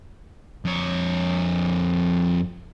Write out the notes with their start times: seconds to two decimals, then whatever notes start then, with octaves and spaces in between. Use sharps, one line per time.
0.65 F2 C#5